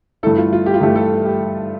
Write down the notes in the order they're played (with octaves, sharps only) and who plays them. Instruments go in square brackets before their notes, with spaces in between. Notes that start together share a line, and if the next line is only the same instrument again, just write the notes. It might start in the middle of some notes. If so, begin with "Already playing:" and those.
[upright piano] G2 E3 A3 E4 [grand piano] A4
[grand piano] F4
F4
G4
F4
[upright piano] G2 E3 A3 E4 [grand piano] G4
[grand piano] A4
G4